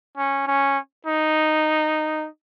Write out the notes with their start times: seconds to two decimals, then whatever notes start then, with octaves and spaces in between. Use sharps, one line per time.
0.17 C#4
0.47 C#4
1.06 D#4